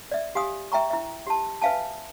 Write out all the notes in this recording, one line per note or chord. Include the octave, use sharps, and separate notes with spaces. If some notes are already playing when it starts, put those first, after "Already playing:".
D5 E5
G4 F5 G#5 D#6
E5 G5 A#5 C#6
E4 E5
G4 A5
B4 E5 F5 G#5 A5